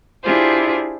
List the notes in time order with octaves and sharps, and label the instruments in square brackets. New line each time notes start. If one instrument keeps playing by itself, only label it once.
[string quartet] D4 E4 F4 G4 G#4 C5